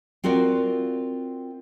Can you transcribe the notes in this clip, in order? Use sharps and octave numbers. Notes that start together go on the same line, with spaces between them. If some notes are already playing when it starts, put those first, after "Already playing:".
C4 F4 F#4 A#4 D5